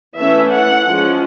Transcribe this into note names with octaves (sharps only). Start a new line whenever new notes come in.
E3 A3 C#4 E5
F#5
F3 G#3 C#4